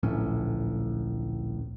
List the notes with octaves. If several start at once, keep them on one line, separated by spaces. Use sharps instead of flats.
D1 A#1 A2 C#4